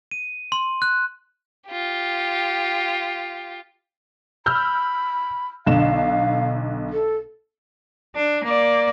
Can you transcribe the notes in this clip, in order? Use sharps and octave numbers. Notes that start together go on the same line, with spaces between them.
D#7
C6
F#6
F4 G4
B5 E6 F6 G6
B1 D3 F5 E7
A4
D4
A#3 D5